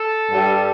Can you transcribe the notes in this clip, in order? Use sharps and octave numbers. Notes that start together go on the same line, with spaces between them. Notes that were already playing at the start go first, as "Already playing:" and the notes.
Already playing: A4
G2 G3